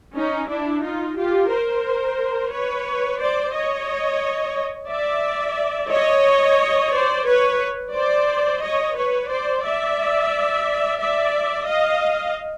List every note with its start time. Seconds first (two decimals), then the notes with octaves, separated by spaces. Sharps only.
0.15 C#4 D#4
0.48 D4 E4
0.82 D#4 F4
1.16 F4 G4
1.50 A#4 C5
2.52 B4 C#5
3.20 C5 D5
3.54 C#5 D#5
4.90 D5 E5
5.91 C#5 D#5
6.92 C5 D5
7.26 B4 C#5
7.94 C5 D5
8.62 C#5 D#5
8.96 B4 C#5
9.30 C5 D5
9.63 D5 E5
10.99 D5 E5
11.67 D#5 F5